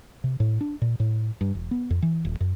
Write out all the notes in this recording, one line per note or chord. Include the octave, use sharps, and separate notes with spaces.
C3
A2
D4
A#2
A2
G2
E1
B3
F2
E3
D#1
F#2